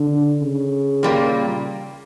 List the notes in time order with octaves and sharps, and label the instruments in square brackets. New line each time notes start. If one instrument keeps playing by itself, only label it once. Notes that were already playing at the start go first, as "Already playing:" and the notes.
Already playing: [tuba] D3
C#3
[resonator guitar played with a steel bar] A#2 G3 A#3